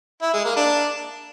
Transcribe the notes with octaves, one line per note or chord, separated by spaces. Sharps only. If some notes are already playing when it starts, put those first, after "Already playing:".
E4
G#3
A#3
D4